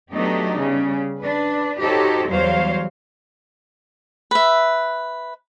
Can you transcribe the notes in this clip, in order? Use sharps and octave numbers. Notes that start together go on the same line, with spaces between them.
F#3 A3 B3 D4 D#4 G4
C#3 G3
D4 B4
D#4 F#4 G4 A4 C5 C#5
E2 F#3 G3 C5 C#5 F5
B4 E5